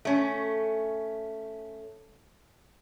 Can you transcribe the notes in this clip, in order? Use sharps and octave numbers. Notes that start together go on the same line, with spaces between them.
A3 C#4